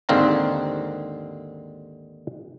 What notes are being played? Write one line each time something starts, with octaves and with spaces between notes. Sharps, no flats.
D#2 G#2 D3 C4 F5 A#5